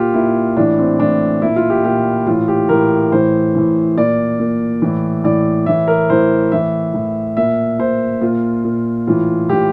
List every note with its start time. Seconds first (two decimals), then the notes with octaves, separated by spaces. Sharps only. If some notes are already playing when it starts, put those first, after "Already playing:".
Already playing: A#2 F4 G4
0.14 A#2 E4
0.57 A2 E3 D4
0.79 C4
0.99 A2 E3 D4
1.42 A#2 E4
1.56 F4
1.70 G4
1.84 A#2 G4
2.27 A2 E3 F4
2.48 G4
2.69 A2 E3 A#4
3.12 A2 E3 C5
3.55 A2 E3
3.97 A#2 D5
4.40 A#2
4.82 A2 E3
5.24 A2 E3 D5
5.66 A2 E3 E5
5.88 A#4
6.10 A2 E3 C5
6.52 A2 E3 E5
6.94 A2 E3
7.37 A#2 E5
7.79 A#2 C5
8.21 A#2 F4
8.65 A#2
9.07 A2 E3 F4
9.49 A2 E3 G4